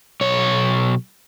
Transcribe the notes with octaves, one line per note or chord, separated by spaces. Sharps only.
B1 C#5